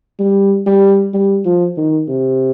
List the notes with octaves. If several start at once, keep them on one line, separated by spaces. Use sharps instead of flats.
G3
G3
G3
F3
D#3
C3